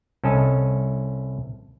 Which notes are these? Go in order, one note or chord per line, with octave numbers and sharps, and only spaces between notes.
C2 C#4 A4 D#5 A5